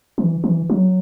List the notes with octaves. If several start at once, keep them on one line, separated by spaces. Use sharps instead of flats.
E3
E3
F#3